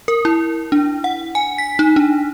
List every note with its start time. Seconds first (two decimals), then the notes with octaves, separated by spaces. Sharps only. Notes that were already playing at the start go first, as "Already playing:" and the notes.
0.08 A#4
0.25 E4
0.72 D4
1.04 F#5
1.35 G#5
1.58 B6
1.79 D#4
1.96 D4